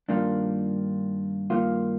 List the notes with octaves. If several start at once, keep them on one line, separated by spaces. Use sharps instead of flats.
G2 D#3 A#3 D4 F4
G2 D#3 A#3 F4